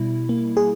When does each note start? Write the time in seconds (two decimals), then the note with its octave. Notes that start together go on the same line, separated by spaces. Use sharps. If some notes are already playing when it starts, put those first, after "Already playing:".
Already playing: B2 G3 E4
0.29 A#3
0.57 G#4